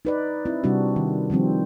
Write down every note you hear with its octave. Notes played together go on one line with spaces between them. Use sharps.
D#4 B4 D5
C4 E4
C3 G3 C4 D4 F#4
D#3
D#3 F3 G3 C4